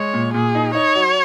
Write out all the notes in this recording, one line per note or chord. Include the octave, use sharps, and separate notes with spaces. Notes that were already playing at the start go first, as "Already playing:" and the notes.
Already playing: G#3 C#5
A#2
A#2 G#4
D#4
D#4 C#5
F#3